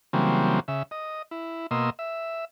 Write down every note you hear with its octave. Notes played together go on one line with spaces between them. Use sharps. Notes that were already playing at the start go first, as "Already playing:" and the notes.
C#3 E3 F#3 G3 A#3 C4
C#3 E5
D#5
E4
B2 A#3 D#5 C6 E6
E5